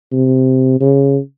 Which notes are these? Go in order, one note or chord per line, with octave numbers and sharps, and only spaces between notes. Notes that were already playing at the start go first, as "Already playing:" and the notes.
C3
C#3